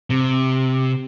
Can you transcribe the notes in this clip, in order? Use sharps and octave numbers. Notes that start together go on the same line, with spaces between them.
C3